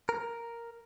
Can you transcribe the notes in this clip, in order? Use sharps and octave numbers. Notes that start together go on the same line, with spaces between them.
A#4